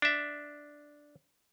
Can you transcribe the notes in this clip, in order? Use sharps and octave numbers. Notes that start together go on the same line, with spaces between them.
D4 E5